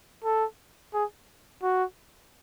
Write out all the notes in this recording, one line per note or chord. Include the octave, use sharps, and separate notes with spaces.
A4
G#4
F#4